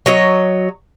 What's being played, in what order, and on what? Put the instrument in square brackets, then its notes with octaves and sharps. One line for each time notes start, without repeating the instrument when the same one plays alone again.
[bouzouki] F#3 C#5 D#5